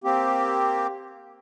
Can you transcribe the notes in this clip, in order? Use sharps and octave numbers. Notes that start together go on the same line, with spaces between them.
A#3 C4 G4